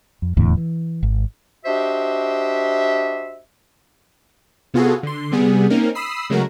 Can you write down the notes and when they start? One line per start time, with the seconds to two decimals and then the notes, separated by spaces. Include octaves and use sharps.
0.22 F2
0.37 D#1 E2 A2 D3
0.57 E3
1.03 G#1
1.65 D4 F#4 G4 C5 D#5 E5
4.74 C3 B3 F4 F#4 G#4 A4
5.03 D3 C6
5.32 C3 G3 B3 G#4
5.70 A#3 C4 C#4 D#4 A#4
5.95 B5 D#6 E6 C7
6.30 C#3 F#3 G#3 A3 F#4 A#4